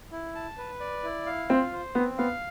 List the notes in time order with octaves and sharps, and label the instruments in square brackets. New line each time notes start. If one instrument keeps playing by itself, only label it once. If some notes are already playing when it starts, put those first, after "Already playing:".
[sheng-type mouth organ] E4
A5
B4
D5
E4
F5
[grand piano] C4 [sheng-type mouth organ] F4
[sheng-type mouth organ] C5
[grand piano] B3 [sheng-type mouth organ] C4
[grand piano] B3 [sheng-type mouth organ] F5